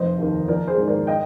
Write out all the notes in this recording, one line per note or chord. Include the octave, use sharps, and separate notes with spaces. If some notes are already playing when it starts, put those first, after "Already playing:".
Already playing: F1 C5 D#5
D#2 D#3
A#1 A#4 D5
G#4 C5
G#2 D#3
A#4 D5
D#5 G5